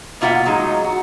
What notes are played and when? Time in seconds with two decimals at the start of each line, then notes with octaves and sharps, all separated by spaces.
0.21 B2 A#3 E4 F4 E5 F#5
0.46 A2 F#3 G#3 D#4
0.84 F#4